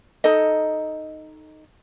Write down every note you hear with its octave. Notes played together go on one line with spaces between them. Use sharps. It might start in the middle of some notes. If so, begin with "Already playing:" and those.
D#4 A4 D#5